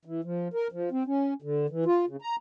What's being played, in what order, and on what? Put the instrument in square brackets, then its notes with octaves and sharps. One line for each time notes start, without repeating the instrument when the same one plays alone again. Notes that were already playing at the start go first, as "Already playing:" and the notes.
[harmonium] E3
F3
A#4
F3
C4
C#4
D3
E3
F4
C#3
A#5